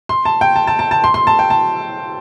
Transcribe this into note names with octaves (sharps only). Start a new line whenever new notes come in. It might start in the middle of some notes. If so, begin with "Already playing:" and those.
C6
A5
G5
A5
A5
A5
A5
C6
C6
A5
G5
A5